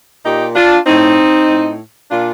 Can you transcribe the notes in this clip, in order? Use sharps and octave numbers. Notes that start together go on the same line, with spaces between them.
A#2 D#4 G4
D4 F4
A2 C4 D#4
A2
A#2 D4 F4